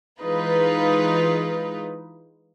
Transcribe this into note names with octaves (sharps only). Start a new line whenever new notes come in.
E3 G#3 D#4 F4 B4